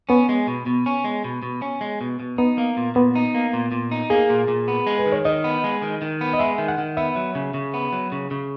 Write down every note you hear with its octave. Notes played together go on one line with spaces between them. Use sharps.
B3 C#4
G#3
B2
B2
C#4
G#3
B2
B2
C#4
G#3
B2
B2
B3 D#4
A#3
A#2
A#2 B3
D#4
A#3
A#2
A#2
D#4
A#3 G#4
A#2
A#2
B3
G#3
B4
D#3
C#5
D#3 D#5
B3
G#3
D#3
D#3
B3
D#5
G#3 E5
D#3
F#5
D#3
B3 E5
F#3
C#3
C#3
B3
F#3
C#3
C#3